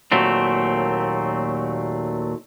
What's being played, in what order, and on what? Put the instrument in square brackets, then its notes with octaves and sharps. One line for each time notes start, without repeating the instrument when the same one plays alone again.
[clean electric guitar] D#2 A#2 F#3 A3 C4